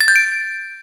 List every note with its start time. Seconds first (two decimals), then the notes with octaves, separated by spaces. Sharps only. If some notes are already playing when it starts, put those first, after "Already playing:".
0.01 A6
0.08 G6
0.16 D7